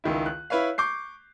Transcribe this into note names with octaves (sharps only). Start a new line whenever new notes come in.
C#2 D#3 E4
F#6
E4 B4 C#5 F5
C#6 D6 G6 C7